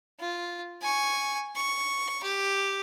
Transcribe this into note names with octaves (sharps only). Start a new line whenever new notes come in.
F4
G#5 C#6
C#6
G4